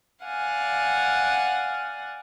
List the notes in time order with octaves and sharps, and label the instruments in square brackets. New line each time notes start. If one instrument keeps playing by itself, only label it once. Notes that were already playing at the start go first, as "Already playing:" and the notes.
[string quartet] D5 F5 F#5 G#5